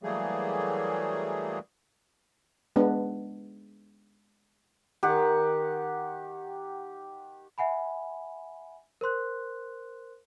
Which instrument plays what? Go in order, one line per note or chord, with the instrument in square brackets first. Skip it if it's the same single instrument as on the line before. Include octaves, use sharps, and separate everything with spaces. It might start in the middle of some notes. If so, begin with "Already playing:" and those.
[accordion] E3 F#3 G3 A3 A#3 G#4
[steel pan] G#3 B3 D4
[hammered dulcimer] D#3 [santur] G4 F#5
[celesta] E5 F#5 G#5 B5
A#4 C5 C6 F#6